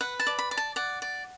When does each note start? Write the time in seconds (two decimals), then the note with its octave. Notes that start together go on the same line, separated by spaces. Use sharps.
0.01 B4 F#5
0.20 A5
0.27 D5
0.39 B5
0.51 D5
0.57 A5
0.76 D5 F#5
1.02 D5